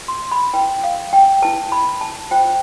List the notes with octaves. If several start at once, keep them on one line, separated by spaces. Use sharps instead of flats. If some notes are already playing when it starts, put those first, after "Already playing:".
Already playing: F4
C6
B5
E4 B4 G5
F5
G5
E4 B4 A5
B5
A5
F4 C5 G5